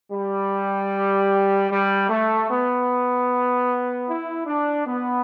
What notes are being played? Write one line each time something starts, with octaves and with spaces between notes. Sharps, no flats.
G3
G3
A3
B3
E4
D4
B3